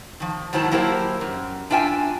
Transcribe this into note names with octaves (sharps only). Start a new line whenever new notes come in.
D#3 F3
G#2 D#3 F#3 E4 C5 A5
F#3 A#3 E4 G4 A#4 C5
F#2
F#2 D4 F4 E5 G5 G#5